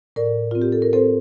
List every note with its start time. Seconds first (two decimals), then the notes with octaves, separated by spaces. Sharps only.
0.16 A2 A#4 D5
0.51 C4 F4
0.62 G4
0.72 A4
0.82 A#4
0.93 C4 A4 C5